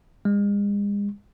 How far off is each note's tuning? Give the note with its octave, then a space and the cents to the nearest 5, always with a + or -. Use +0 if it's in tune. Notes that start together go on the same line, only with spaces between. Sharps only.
G#3 -40